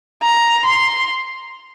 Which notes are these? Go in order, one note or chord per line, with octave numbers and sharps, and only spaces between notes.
A#5
C6